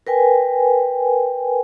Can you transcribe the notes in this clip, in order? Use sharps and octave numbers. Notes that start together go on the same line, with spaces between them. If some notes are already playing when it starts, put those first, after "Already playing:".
A#4 B4 G5 G#5